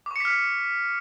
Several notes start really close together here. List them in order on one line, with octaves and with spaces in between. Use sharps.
D6 C#6 C#7 B6 F6